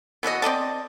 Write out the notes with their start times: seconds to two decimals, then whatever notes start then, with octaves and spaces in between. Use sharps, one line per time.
0.23 B2 E3 F#4 D#5
0.42 C4 D5 D#5 A5